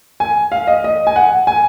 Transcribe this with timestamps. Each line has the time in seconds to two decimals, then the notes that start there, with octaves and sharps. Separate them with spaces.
0.20 G#5
0.52 F5
0.67 D#5
0.84 D#5
1.07 G#5
1.16 F#5
1.47 G#5